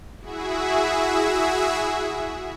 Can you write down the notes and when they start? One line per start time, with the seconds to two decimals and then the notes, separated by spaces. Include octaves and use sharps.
0.20 E4 F#4 G#4 E5